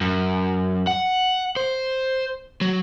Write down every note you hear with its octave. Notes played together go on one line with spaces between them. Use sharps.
F#2
F#5
C5
F#3